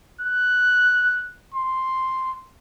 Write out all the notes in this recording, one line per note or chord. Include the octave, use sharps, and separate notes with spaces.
F#6
C6